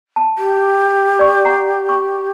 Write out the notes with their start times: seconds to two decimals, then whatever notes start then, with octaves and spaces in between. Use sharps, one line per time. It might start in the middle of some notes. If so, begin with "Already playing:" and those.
0.16 A5
0.38 G4
1.19 D5 C#6
1.45 F#5 A#5
1.89 C#6